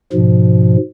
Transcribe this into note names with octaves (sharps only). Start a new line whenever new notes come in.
G#2 B2 F3